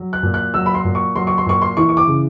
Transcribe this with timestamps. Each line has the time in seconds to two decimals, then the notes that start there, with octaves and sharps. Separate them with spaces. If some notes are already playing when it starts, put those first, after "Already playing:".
Already playing: F#3
0.13 F#6
0.23 A#2
0.34 F#6
0.54 F#3 E6
0.66 B5
0.74 C6
0.84 A#2
0.95 C#6
1.15 F#3 C6
1.27 C#6
1.38 C6
1.46 A#2 C#6
1.62 C6
1.77 E3 C#6
1.89 C#6
1.97 D6
2.07 C#3